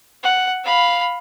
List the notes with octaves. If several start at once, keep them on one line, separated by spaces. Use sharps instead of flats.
F#5
F5 B5